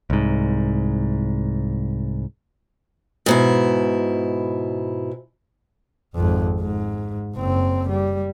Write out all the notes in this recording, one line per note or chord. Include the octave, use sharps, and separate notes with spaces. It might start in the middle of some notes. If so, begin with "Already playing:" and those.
C2 G#2
G#2 B2 E4
G#1 F2
G#2
F#1 C4
G3